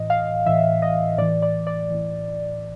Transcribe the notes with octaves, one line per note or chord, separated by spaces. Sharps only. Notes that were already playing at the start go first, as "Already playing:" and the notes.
Already playing: A2 E3 D#5
F5
A2 E3 E5
D#5
A2 E3 D5
D5
D5
A2 E3